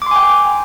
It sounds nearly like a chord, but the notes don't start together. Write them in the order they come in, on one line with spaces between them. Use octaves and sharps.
D6 C6 G#5 G5